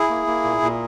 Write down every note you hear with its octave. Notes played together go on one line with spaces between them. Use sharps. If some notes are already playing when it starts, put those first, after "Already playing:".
Already playing: E4 G#4
A#3
A#3
A#2
A#2